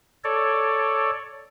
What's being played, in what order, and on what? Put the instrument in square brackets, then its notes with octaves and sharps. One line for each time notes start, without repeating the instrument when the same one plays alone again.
[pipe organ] A4 C#5 D5